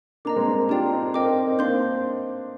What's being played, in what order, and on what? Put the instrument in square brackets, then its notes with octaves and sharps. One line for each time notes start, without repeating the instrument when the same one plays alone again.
[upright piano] A#3 D4 [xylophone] D#5 A#5 D6
[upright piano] G#3 C4
A#3 D4
[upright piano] D4 F4 [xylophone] G4 D5 G5 A#5
[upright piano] C4 D#4
[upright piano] C4 D#4 [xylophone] A#4 D#5 G5 D6
[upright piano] C4 D#4
C4 D#4
[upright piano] A#3 D4 [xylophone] C5 F5 C6 G6